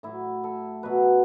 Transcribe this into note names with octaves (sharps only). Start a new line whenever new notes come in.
A2 F#3 E4
A4
B2 F#3 B4